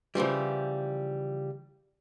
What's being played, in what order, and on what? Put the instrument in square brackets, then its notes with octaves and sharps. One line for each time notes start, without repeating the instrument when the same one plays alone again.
[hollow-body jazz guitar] C#3 E3 F3 G3